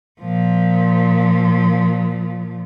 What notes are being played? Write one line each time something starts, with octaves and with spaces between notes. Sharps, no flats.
A#2 F3